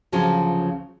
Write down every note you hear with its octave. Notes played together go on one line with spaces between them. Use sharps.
D2 C#3 F3 F#3 C#4 F4